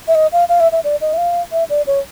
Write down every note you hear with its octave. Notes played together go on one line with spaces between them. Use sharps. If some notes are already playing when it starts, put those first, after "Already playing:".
E5
D#5
F5
F5
E5
E5
D5
D#5
E5
F5
E5
D5
C#5